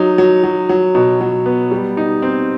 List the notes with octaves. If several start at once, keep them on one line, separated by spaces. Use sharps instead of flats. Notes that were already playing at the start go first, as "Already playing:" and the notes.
Already playing: F#3 D#4
F#3
F#3
F#3
B2
F#3
B3
G3
D#4
C4